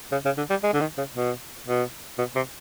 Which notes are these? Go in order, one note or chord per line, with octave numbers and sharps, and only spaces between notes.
C#3
C#3
D3
G3
G#3
D3
D#3
C#3
B2
B2
B2
C3